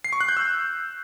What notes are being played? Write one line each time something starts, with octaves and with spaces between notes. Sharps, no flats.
C7
C#6
F#6
G6
E6